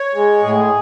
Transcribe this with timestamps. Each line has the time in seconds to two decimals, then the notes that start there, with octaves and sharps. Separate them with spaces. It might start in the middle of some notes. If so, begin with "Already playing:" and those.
Already playing: C#5
0.14 G#3
0.43 A2 G#4